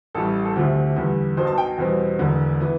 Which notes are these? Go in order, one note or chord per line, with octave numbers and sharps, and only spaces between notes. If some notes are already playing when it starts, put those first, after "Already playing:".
A1 A2 G3 A4
A4
D2 D3 F3 A3 C4 G4
E2 D3 G3
B1 B2 B3 C5
A5
G5
E2 B2 G3 C4
E1 E2 D3
E3 B3